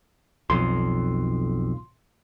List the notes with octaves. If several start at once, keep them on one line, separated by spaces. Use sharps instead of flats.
B1 F2 C6